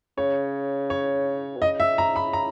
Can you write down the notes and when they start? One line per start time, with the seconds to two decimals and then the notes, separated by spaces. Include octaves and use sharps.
0.18 C#3 C#5
0.90 C#5
1.56 B2
1.62 C#3 D#5
1.80 E5
1.98 A#5
2.16 B5
2.33 A#5